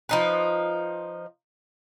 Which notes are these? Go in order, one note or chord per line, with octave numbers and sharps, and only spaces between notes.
F3 D#4 B4